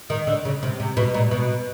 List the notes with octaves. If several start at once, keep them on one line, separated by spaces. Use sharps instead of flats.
D#3
D3
C#3
C3
C3
B2
A#2
B2